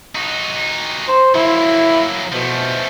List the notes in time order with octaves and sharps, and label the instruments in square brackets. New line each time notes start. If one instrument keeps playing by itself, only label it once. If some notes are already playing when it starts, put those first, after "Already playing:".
[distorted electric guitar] D#4 F#4
[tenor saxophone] C5
[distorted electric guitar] F#3 A#3 [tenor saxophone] E4
[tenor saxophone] B2 [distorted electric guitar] F3 A3